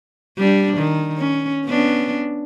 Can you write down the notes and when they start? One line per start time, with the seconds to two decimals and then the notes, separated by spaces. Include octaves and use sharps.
0.39 G3 D4
0.78 D#3
1.18 C#4
1.66 B3 C#4 D4